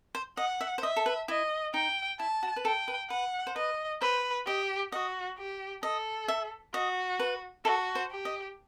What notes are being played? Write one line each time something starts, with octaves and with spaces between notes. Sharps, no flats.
C5
D#5 F#5
E5
C5
D#5 E5
A4
B4
E4 D#5
D#4 G5
E4 A5
F#4
B4
A4 G5
B4
B4 F#5
C5
B4 D#5
B4 C5
G4 D#5
F#4 D#5
G4
A4 D#5
E5
F#4 D#5
B4
F#4 A4
C5
G4
D#5